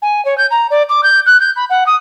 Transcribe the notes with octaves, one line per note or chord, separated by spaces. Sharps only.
G#5
C#5
G6
A#5
D5
D6
G6
F#6
G6
B5
F#5
D#6